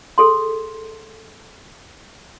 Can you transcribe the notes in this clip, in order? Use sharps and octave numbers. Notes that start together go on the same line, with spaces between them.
G#4 A4 C6